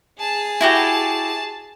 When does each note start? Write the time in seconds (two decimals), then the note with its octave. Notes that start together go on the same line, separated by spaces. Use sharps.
0.19 G#4 A5
0.61 E4 F#4 G4